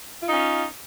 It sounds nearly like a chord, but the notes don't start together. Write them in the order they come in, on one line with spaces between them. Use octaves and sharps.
F4 D#4 C#4